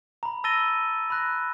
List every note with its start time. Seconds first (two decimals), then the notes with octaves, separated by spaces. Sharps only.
0.23 A#5 B5
0.44 A5 E6 A6 A#6 D#7 G7
1.10 B5 F#6 A#6